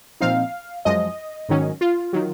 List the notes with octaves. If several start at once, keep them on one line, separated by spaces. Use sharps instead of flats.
A#2 F3 C4 D#4 F5
F#2 F3 G#3 D#5
G#2 D#3 F#3 C#4
F4
D#3 F#3